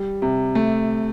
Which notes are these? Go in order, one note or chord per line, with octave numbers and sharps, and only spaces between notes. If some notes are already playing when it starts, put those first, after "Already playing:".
Already playing: G3
C3
A3